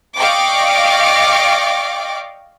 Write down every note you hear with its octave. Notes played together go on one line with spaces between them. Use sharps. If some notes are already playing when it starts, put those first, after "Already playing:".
D5 D#5 F5 G5 C#6 D6